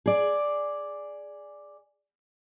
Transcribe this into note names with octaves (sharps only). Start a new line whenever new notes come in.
G#4 D5